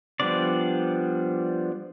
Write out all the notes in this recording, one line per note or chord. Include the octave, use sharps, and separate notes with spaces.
F3 G3 B3 D4 D5